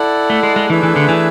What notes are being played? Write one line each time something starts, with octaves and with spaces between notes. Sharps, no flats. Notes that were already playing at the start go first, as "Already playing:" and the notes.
Already playing: E4 A4 D5 F#5
A3
G#3
G#3
E3 A3 D4 G#4 B4 E5
E3
D3
E3